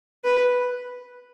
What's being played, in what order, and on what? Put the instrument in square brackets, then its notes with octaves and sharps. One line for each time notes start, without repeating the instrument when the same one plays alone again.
[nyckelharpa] B4